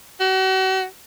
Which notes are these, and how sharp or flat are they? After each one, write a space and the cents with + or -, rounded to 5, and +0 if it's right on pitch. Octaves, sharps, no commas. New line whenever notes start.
F#4 +40